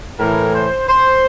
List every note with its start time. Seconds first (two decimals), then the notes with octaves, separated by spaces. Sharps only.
0.19 A2 E3 A#4
0.54 C5
0.88 C5